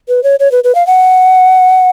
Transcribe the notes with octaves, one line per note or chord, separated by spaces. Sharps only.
B4
C#5
C#5
B4
B4
F5
F#5